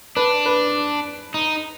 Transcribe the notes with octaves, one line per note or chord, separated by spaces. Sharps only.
D4 B4
B4
D#4